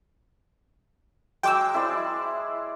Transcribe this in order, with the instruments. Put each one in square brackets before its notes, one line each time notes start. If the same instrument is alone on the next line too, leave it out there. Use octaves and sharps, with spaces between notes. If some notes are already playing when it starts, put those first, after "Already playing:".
[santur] F#3 G#3 [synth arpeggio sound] G5 D6 E6
[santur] E4 C5 D5